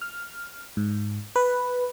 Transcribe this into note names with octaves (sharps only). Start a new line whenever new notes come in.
F6
G#2
B4